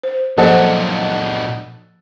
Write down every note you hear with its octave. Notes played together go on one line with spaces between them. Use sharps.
C5
A#2 F3 F#3 A#3 A4 C5 D#5 F#5